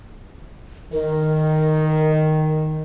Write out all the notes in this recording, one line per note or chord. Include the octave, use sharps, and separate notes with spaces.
D#3 A#4